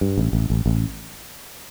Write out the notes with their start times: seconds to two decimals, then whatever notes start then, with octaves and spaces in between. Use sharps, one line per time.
0.01 G2
0.18 A1
0.33 A1
0.50 A1
0.66 A1